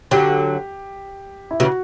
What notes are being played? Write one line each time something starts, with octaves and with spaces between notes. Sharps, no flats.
D3 F#3 G4
E4
C#3 E3 F#4